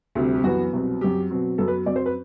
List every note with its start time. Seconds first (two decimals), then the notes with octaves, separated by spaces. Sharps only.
0.15 D2 C3 G3 C4
0.35 G4
0.44 F#2 E3 B3 F#4
0.73 C2 B2 F#3 C4
1.01 F#2 F#3 C4 G4
1.30 B2 F#3 C4
1.58 F#2 F#3 B3 A4
1.68 B4
1.86 F#2 F#3 C4 D5
1.96 C5
2.06 B4